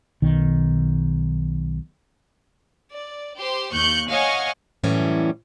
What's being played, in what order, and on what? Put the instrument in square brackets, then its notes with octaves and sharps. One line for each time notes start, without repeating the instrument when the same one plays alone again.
[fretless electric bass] B1 D#3
[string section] D5
G4 C5 C6
D#2 C#6 F#6 G6 C#7
C#5 D#5 F5 F#5 G#5 C#6
[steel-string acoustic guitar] F#2 A2 E3 G3 C#4